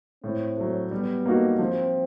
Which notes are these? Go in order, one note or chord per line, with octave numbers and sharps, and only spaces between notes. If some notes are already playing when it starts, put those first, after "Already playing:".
A2 C4
F#3 A3
G3 B3
A#3 D#4 F#4 A4
F3 C4